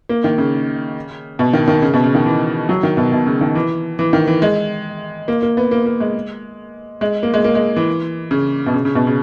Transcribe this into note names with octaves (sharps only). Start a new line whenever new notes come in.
A#3
D#3
C#3
B2
D#3
D#3
C#3
B2
C#3
D#3
E3
F#3
D#3
B2
B2
C#3
D#3
E3
E3
D#3
E3
G#3
A#3
A#3
B3
A#3
A#3
G#3
G#3
A#3
G#3
A#3
G#3
E3
C#3
B2
C#3
C#3
B2
C#3